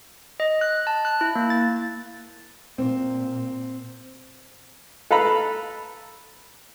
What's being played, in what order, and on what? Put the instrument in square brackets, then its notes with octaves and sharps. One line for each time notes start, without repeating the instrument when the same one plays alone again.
[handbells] D#5
F#6
A5
F#6
E4
A#3
A6
[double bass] A#2 [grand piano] C4
[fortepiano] A4 B4 F5 A#5 B5